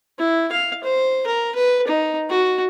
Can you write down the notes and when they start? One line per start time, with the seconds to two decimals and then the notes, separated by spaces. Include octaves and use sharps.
0.19 E4
0.52 F5
0.84 C5
1.27 A#4
1.56 B4
1.88 D#4
2.30 F#4